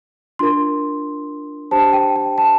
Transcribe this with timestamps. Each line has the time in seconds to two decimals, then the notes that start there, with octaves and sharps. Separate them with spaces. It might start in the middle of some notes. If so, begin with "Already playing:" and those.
0.39 D4 F4 A#4 C6
1.71 D4 G4 C5 A5
1.93 G5
2.16 G5
2.38 A5